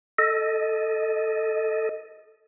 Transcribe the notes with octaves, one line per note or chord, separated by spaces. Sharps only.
A4 D#5